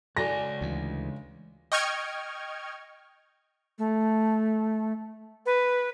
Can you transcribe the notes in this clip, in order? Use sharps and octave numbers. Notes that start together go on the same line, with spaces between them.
C#2 F#4 A4 D5 G#5 A#6
D2 E3
D#5 G5 C#6 F6 G#6
A3
B4